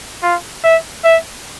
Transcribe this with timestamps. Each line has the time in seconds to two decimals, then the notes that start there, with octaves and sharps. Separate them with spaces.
0.23 F4
0.64 E5
1.04 E5